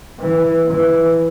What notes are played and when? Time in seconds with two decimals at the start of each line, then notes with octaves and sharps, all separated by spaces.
0.20 E3
0.68 E3